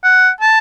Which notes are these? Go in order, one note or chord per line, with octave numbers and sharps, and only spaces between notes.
F#5
A5